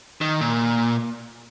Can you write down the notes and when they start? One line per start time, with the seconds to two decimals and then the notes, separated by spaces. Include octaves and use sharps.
0.21 D#3
0.41 A#2